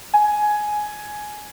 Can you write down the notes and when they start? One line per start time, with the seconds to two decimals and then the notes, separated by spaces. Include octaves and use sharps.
0.14 G#5